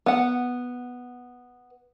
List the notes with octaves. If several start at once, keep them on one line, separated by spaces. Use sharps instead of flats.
B3 F#5